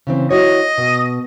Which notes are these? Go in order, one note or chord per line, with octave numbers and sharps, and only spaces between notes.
C#3 E3 C4
E4 F#4 C#5 D#5
B2